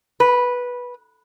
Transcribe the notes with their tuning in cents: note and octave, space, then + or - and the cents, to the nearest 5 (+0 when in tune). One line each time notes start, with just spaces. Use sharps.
B4 -10